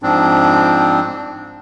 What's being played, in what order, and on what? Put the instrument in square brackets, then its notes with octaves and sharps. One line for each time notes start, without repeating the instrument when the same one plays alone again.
[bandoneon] G#2 F3 C4 D4